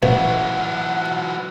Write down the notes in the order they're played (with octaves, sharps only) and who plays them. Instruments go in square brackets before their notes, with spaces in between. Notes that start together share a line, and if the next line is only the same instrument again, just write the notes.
[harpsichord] A1 [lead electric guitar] E3 F#3 [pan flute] F#5